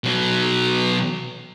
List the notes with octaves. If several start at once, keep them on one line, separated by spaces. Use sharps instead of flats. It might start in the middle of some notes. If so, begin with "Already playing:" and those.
B2 F#3